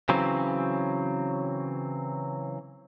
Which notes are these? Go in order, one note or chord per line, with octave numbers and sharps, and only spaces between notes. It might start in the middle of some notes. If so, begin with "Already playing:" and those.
C#3 E3 F#3 C4